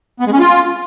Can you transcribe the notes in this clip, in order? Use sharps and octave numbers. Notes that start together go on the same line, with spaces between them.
B3
G#3
C#4
F4